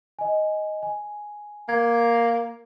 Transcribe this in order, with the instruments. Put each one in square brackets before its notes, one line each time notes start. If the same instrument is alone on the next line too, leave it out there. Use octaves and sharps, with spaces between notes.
[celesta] D#5 G#5
G#5
[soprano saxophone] A#3 [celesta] G#6